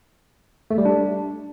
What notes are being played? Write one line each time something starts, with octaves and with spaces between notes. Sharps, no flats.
A3
G3
D4